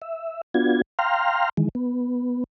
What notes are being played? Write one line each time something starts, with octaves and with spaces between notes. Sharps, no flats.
E5
B3 D4 F4 F#4 G#6
F5 G5 A#5 C6 F6
D#3 E3 G#3
B3